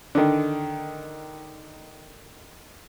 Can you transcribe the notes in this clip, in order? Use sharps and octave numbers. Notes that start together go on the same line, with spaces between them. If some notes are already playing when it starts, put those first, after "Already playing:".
D3 D#3